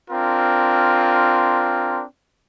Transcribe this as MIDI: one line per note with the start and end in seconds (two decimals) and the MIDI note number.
0.11 2.03 60
0.11 2.03 62
0.11 2.03 65
0.11 2.03 70